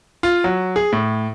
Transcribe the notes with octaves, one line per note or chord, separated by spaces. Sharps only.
F4
F#3
G#4
A2